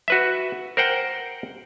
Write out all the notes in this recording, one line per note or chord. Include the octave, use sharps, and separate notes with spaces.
F#4 B4 E5
A#4 C5 F#5 G5